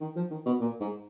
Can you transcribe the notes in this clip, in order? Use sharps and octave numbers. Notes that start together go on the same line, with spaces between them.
D#3
F3
D#3
B2
A#2
G#2